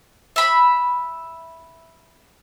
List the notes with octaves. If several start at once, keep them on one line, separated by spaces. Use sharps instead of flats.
E5 B5